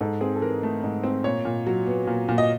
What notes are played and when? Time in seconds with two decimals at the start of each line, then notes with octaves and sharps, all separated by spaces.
0.01 G#2 A4
0.21 C4 G#4
0.36 A4
0.42 E3 A#4
0.63 A3
0.84 G#2
1.04 C4
1.24 A#2 C#5
1.45 A#2
1.67 F#3
1.86 B3
2.07 A#2
2.29 A#2
2.38 D#5